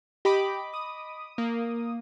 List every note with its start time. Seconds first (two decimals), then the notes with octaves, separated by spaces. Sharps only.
0.25 G4 D#5 B5 D6
0.73 D#6
1.38 A#3